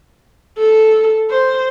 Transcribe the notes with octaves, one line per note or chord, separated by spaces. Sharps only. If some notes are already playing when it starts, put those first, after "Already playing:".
A4
C5